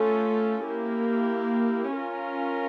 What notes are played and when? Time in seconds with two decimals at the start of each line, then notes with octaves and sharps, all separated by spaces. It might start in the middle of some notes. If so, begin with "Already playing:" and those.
Already playing: A3 C#4 F4 A4
0.65 A#3 E4 G4
1.93 C#4 F4 A#4